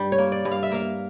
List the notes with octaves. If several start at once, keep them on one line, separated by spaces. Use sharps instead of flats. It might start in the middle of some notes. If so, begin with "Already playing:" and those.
Already playing: G2 G3
C#5
A#3
D5
G2
F5
E5
A#3 F5